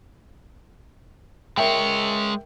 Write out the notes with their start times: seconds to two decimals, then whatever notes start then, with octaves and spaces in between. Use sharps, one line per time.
1.57 G#3 A#4 C#5 E5 G5